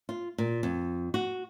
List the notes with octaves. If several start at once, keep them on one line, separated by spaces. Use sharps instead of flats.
F4
A#2
F2
F#4